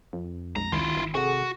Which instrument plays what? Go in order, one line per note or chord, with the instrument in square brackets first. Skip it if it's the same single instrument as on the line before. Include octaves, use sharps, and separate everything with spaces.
[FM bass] F2
[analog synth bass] B1 [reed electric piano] G#3 [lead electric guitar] A#5
[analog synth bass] C#2 [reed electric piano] D#3 [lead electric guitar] E4 F4
[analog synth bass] G#1
[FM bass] C3 [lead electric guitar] F#4 [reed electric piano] G#4 A4 F#5